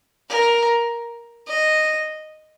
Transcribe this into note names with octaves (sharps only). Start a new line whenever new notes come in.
A#4
D#5